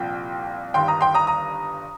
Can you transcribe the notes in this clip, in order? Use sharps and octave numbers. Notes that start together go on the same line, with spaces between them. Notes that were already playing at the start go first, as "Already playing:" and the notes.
Already playing: C2 A#2 F3 G5
G1 G2 D#3 G5 C6
A#5 D#6
G5 C6
A#5 D#6
A#5 D#6